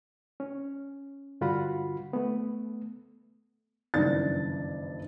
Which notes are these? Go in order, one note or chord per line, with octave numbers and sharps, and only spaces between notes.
C#4
G2 D3 F4 F#4 F#5 B5
A3 B3
F#1 G2 D#3 E3 D5 A6